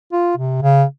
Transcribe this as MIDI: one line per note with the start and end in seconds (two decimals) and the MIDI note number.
0.12 0.34 65
0.37 0.61 48
0.62 0.84 49